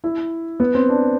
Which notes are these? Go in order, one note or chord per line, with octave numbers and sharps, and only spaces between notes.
E4
B3
C4
D4